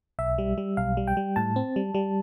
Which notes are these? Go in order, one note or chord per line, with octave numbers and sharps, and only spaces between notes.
B1 E5
G3
G3
B1 F5
G3
G5
G3
A2 A5
C4
G3
G3